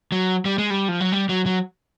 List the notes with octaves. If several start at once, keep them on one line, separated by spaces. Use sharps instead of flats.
F#3
G3
G#3
G3
F3
F#3
G3
F#3
F#3